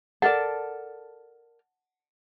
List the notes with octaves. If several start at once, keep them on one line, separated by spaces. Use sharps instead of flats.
A4 A#4 D5 F#5 A5